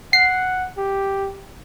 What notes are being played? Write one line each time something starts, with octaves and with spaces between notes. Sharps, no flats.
F#5 C7
G4